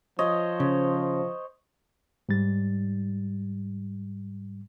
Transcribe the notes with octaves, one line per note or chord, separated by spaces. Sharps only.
F3 C5 C#5 D#5
C#3
G#2 G3 A6